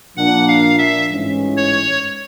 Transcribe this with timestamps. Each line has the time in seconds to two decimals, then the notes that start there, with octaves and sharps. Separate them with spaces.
0.16 A#2 F3 A#3 D4 F#5
0.48 F5
0.78 E5
1.10 A1 G#2 E3 G#3 C#4
1.57 C#5